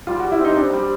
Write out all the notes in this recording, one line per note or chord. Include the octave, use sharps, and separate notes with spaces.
G3 F4
F#4
G3
E4
C4 D#4
C4 D4
G3